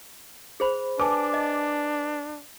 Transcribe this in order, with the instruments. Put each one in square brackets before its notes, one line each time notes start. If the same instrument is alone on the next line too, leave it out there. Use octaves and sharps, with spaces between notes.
[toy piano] G#4 C5 B5
[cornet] D4 [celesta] B4 G#5 A5 [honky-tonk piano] D6
[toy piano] D#5